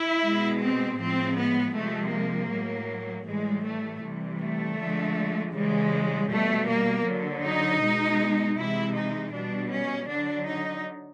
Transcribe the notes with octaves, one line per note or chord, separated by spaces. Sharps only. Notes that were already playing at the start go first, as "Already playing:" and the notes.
Already playing: E4
B2 G#3
C4
A2 F3 G#3 C4
B3
C3 F3 G#3 A3
A#3
A2 F#3
A2 E3 G3 G#3
A3
C3 E3 G3
A3
D3 F3 G#3
C#3 E3 G3 G#3
B2 G3 A3
A#3
D3 F#3
D#4
B2 G#3
C3 E3 G#3 E4
D#4
B2 G3 D4
C#4
D3 F#3 D4
D#4